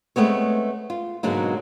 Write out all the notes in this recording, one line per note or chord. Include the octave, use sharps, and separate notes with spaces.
G#3 A3 B3 C4 C#5
F4
G#2 B2 D3 F#3 G#3 A#3